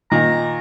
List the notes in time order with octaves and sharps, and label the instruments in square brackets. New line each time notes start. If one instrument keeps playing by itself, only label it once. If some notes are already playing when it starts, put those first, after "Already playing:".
[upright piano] A#2 D#3 [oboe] A#5